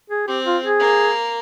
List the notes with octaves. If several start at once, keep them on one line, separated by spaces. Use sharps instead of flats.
G#4
C4 G4
F4
G#4
A#3